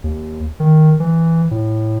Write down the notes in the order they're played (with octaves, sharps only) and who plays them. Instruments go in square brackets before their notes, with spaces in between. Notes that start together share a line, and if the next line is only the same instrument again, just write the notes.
[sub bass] D#2
D#3
E3
A2